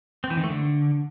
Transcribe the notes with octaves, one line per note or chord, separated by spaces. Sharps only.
C4
E3
D#3
A3
D3